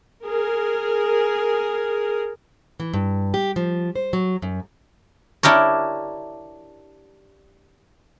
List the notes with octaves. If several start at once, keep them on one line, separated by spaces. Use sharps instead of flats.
G#4 A#4
E3
G2
G4
F3
C5
F#3
F#2
D4 E4 G4 A#4 C#5